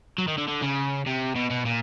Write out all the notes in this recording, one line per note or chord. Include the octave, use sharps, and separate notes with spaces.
F#3
D#3
D3
D3
C#3
C3
B2
B2
A#2